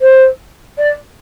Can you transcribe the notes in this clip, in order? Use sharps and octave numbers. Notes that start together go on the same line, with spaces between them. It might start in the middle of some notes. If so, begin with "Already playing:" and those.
C5
D5